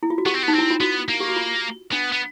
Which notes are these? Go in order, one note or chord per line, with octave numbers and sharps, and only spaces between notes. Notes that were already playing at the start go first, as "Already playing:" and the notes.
E4
F4
F#4
B3 G4
C4
B3
D#4
C4
E4
F4
B3 F#4
A#3
G4
F#4
F4
B3 D4
B3